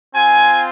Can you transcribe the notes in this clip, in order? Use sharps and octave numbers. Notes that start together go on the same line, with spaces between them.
C4 F4 G#5